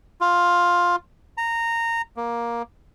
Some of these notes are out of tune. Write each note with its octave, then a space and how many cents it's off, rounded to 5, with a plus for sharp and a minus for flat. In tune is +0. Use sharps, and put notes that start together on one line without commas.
F4 +10
A#5 -15
A#3 +10